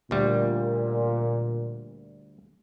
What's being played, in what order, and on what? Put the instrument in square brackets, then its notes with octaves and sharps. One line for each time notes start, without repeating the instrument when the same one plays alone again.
[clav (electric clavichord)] D2 G3 [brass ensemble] A#2